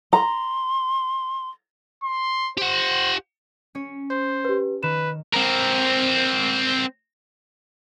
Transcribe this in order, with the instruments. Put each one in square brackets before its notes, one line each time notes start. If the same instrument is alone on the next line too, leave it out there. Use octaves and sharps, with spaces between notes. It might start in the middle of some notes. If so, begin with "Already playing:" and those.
[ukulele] A#5 [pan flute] C6
[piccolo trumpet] C6
[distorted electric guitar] G4 F#5 [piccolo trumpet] C5
[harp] C#4 C#5
[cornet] C5
[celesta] G4 B4
[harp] D#3 [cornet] B4 [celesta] E7
[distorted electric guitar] C4 A#4